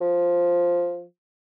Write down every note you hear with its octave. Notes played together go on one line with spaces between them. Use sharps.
F3